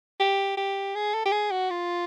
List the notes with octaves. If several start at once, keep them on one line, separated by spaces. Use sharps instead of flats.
G4
G4
G#4
A4
G4
G#4
F#4
F4